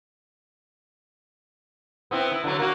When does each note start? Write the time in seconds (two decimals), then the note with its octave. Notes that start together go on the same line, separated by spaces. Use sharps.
2.11 B3 C4 E4
2.32 E4
2.44 D3 F#3
2.59 A#3 F#4